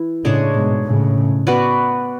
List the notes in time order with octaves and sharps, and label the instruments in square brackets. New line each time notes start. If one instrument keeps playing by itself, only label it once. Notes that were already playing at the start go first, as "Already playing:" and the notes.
Already playing: [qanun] E3 E4
[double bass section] A2 C#3 [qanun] G#3 D4 G#4 C#5
[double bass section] G#2 B2
A2 C#3
[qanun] B3 F#4 B4 D5